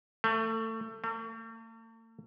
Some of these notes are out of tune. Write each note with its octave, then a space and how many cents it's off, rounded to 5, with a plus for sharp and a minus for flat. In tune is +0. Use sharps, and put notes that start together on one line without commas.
A3 +25
A3 +45